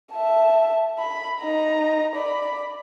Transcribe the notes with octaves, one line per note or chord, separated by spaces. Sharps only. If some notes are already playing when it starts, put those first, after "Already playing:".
E5 A5
B5
D#4 A#5
D5 B5